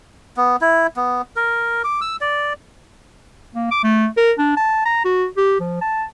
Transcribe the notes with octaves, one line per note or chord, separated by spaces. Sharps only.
B3
E4
B3
A#4
D6
E6
D5
A#3
D6
A3
A#4
D4
A5
A#5
F#4
G4
F3
A5